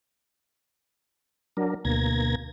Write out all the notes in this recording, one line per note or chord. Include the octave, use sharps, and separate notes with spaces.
F#3 D4 A#4
D2 B2 A#3 G#6 A#6